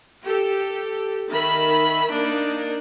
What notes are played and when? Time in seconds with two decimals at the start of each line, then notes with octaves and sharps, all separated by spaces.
0.23 G4 A4
1.29 D#3 E5 B5
2.10 A#3 D4 D#4